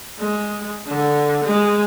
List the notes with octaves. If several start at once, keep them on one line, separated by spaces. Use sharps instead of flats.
G#3
D3
G#3